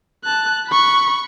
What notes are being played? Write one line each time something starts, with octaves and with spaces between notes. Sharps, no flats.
A5 F#6
B5 C#6